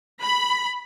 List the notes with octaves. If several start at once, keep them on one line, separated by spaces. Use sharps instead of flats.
B5